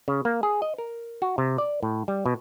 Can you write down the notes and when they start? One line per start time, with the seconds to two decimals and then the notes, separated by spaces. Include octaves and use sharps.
0.08 C#3
0.25 A#3
0.43 G#4
0.62 D#5
0.78 A#4
1.22 F#4
1.38 C3
1.58 D5
1.83 A2
2.08 G3
2.26 B2